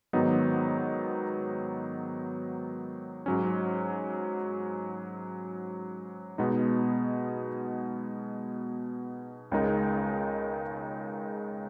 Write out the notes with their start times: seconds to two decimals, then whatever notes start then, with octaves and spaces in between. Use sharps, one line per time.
0.13 G#2 D#3 F#3 B3 D#4
3.26 G#2 F#3 C#4
6.38 B2 G#3 B3 D#4
9.52 C#2 C#3 G#3 D#4 A#4